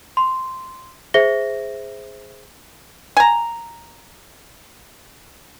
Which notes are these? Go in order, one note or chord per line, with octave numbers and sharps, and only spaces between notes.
C6
G#4 C5 E5 A#6 G7
G#5 A#5